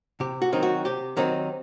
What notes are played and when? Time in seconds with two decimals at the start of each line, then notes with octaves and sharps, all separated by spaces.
0.20 C3 G4
0.42 F#4
0.52 D#3 F#3 C4 D#4
0.63 F#4
0.85 C3 G4
1.17 D#3 F#3 C4 D#4